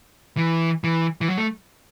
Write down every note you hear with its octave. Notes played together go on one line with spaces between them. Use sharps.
E3
E3
E3
F#3
A3